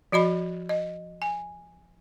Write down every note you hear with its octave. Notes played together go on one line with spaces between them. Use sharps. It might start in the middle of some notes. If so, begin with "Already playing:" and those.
F3 F#4 D#5 B5
D#5
G#5